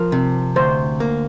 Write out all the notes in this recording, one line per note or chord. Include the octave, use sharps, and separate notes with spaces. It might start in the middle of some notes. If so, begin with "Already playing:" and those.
Already playing: F3 A#4
C3
D2 C5
A#3